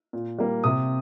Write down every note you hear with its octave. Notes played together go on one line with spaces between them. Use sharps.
A#2
G3 A#3
C3 D#6